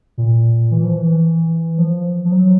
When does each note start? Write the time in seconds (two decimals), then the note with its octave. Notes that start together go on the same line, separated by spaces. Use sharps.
0.18 A#2
0.71 E3
0.84 F3
0.97 E3
1.78 F3
2.25 F3
2.32 F#3